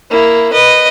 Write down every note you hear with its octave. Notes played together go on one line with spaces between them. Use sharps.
A#3 E4
B4 D#5